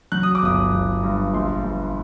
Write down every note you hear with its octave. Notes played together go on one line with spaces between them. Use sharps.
F#3 F#6
D#6
D6
G1 D#6
G1
G2
A#1 C6
A#1